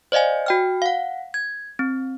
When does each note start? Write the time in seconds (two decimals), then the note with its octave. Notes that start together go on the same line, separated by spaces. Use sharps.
0.12 C5 D5 D#5 F5 G#5
0.46 F#4 G5 F6
0.82 F5 F#5
1.34 G#6
1.79 C4